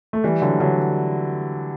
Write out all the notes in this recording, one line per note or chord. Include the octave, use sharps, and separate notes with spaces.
A3
E3 G3
D3 F#3
D3 F#3